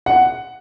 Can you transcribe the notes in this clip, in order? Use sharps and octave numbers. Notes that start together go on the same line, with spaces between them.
F#5